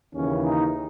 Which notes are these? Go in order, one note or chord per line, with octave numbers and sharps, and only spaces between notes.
D#2 C#3 E3 C#4
D#4